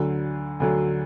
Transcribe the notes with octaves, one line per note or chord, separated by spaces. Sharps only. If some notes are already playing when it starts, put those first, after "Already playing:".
Already playing: D2 D3 F#3
D2 D3 F#3